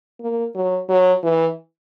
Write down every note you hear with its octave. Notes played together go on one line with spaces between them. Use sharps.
A#3
F#3
F#3
E3